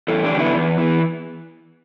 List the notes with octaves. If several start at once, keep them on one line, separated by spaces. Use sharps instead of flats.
E2 E4 A4
D4 G4
D3
B3 E4
E2 B3
E3